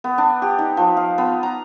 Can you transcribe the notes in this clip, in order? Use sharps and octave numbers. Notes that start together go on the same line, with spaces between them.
B3
D4
G4
D#4
F3
F5
B3
A#5